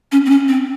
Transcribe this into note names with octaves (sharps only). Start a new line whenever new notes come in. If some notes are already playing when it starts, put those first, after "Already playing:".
C#4
C4
C#4
C4